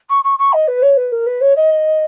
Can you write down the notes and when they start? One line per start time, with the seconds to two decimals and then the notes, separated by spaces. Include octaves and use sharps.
0.09 C#6
0.23 C#6
0.38 C#6
0.52 D#5
0.67 B4
0.82 C#5
0.97 B4
1.11 A#4
1.26 B4
1.41 C#5
1.55 D#5